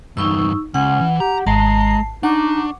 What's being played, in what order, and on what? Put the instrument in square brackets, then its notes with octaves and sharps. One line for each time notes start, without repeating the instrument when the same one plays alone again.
[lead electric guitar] E2 G2 [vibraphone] D#4 C#6 E6
[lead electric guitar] C#2 [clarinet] C#4 [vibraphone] F#5
[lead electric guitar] E3
[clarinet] G4 [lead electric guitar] A#5
[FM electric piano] G#1 C7 [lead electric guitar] G#3 [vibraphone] A5 [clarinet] A#5
[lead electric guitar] D4 [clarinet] D#4 [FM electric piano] F#5 [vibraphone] C#6 D6